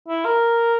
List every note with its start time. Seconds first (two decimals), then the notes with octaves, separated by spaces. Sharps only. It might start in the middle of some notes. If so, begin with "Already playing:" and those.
0.09 E4
0.25 A#4